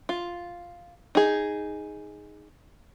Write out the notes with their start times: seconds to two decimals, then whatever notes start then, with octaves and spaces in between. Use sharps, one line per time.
0.09 F4
1.15 D#4 G#4